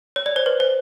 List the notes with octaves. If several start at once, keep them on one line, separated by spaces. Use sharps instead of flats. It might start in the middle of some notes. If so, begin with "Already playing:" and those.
C#5
D5
C5
B4
C5